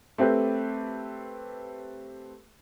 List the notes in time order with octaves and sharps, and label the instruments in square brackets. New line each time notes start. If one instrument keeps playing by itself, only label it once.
[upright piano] A3 C4 G4 B4